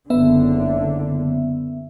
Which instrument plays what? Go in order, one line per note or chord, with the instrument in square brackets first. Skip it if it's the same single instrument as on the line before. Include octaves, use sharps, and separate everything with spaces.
[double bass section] F#1 D3 [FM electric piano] B3 E5